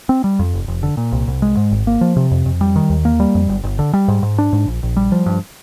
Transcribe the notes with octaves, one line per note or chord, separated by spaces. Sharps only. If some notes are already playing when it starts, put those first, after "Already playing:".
C4
G3
F2
F1
F1
D3
A#2
C2
C2
G#3
G#2
G#1
A#3
F3
C3
F2
F2
G3
D#3
D#2
A#3
G3
F2
G1
G1
D3
G3
G#2
G#2
D4
G#2
A#1
A#1
G3
F3
G2